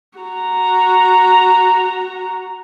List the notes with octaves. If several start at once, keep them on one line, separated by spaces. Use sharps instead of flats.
F#4 A#5